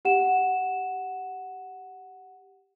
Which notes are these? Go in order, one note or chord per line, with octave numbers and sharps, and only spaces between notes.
G4 F#5 E7